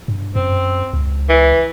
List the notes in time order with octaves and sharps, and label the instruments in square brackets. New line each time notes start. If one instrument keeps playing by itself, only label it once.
[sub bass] G2
[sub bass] F#2 [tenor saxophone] C4
[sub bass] C#2
[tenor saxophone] E3